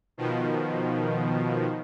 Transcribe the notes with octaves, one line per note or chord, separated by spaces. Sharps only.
B2 D#3 F3